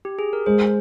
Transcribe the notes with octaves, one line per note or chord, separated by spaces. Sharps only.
G4
G#4
A#4
G#3 C5